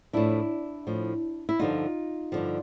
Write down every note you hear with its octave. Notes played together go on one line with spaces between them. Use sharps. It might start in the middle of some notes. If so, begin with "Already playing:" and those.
A2 F3 D4 E4
A2 F3
E4
G2 D3 F3 D#4 F4
G2 D3 F3